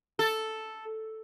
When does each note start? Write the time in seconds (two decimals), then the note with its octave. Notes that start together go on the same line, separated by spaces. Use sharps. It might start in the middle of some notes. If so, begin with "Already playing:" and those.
0.19 A4